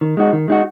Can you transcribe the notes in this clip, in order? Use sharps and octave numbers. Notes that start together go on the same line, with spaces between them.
D#3
G#3 D#4 F#4
D#3
G#3 D#4 F#4